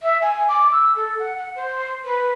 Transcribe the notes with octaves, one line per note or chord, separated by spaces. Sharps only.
E5
G#5
D6
E6
A4
F#5
F#5
C5
B4